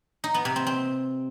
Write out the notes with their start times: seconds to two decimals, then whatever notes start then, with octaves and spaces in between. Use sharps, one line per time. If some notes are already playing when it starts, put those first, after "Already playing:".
0.24 D#4
0.34 B3
0.45 C3
0.56 C4
0.67 C4